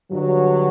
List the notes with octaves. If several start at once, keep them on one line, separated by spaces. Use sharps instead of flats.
G2 D3 F#3